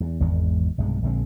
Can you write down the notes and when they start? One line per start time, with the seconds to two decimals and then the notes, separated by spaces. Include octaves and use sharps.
0.01 E2
0.20 G#1 E2 D#3 G#3
0.78 B1 G2 C3 G#3
1.02 A#1 D3 G#3 C4